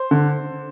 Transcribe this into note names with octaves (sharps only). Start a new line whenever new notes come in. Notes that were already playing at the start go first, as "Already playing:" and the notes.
Already playing: C5
D3